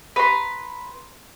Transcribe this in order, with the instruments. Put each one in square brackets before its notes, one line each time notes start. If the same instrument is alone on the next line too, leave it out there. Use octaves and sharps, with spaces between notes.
[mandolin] B4 A#5 C6